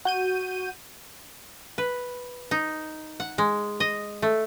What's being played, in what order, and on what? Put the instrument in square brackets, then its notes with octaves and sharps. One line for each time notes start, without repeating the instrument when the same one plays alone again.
[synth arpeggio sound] F#4 G6 D#7
[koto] B4
D#4
F#5
G#3
D#5
A3